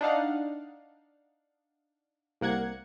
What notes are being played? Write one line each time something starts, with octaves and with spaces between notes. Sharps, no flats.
D4 D#4 F5 F#5
C2 A#3 F#5 G#6 C#7